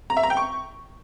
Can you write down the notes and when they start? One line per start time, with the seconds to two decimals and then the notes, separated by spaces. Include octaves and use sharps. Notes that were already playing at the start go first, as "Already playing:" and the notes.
0.10 A#5
0.17 E5
0.23 A#5
0.30 G5
0.37 C#6